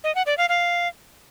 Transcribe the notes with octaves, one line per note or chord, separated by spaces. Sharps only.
D#5
F#5
D5
F5
F5